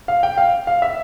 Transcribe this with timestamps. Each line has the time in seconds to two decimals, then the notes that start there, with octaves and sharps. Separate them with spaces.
0.08 F5
0.23 G5
0.38 F5
0.67 F5
0.82 E5